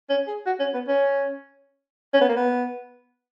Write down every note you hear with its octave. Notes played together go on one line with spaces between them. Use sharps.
C#4
G#4
F#4
C#4
B3
C#4
C#4
B3
A#3
B3